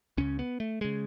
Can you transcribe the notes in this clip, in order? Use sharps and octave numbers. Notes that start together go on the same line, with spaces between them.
C#2 C#3 C#4
B3
A3
C#3 G#3